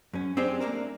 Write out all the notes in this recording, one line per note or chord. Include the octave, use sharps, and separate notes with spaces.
F#2 C#4
C4 D4 G4 G#4 C5
A3 A#3 C4 D4 A#4